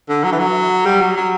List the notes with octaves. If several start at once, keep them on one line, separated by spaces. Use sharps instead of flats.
D3
F#3
E3
F#3
G3
F#3
F#3